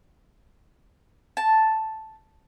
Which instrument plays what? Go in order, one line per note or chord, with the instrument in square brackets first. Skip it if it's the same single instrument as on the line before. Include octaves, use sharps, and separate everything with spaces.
[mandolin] A5